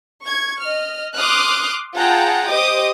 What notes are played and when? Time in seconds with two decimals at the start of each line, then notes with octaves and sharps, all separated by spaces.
0.24 C#6 G#6
0.61 D#5 F6
1.16 C6 D6 D#6 F6 F#6
1.96 F4 G#4 F#5 G5 A5 A#5
2.49 G4 C5 D#5 D6 D#6